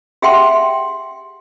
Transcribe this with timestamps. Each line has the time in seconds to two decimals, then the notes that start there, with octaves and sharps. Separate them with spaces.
0.22 G4 G#4 E5 F#5 G5 C6